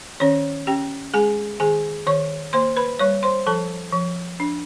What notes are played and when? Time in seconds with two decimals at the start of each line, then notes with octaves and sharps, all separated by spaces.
0.20 D#3 C#4 C#5
0.67 C#4 G4 G5
1.14 G#3 G#4 G#5
1.60 D#3 G#4 G#5
2.07 D#3 C#5 C#6
2.53 A#3 C5 C6
2.77 B4 B5
2.99 G3 C#5 C#6
3.23 C5 C6
3.47 F3 A4 A5
3.93 F3
4.40 D4